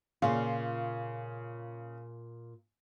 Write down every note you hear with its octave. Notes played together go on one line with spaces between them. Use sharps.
A#2 C#3 F4